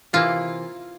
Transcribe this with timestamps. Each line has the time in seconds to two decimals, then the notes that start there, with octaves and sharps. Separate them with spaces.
0.13 C3 E3 A#3 E4 F4